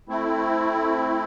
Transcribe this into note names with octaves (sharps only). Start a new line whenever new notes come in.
A3 C4 E4